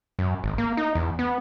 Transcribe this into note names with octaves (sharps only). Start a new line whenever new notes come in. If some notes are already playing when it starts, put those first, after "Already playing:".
F#2
G#1
A#3
D#4
E2
B3